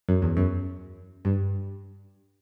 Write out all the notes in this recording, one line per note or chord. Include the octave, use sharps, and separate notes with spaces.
F#2
E2
F#2
G2